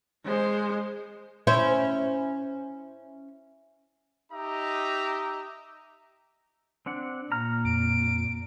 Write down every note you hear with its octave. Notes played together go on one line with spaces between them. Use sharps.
G#3 C5
C#4 E4 C5
D#4 G4 D#5 E5 A#5
C4 D4 F#5
A#2 A#5 F6
F2 D7